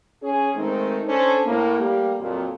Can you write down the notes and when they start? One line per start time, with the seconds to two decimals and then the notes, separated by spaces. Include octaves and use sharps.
0.22 C#4 G#4
0.55 D#3 G#3 A3 C4 D#4
1.07 C#4 D4 A4 C5
1.46 A2 A#3
1.79 G3 A3 A#3 G4
2.20 F2 A#2 F#3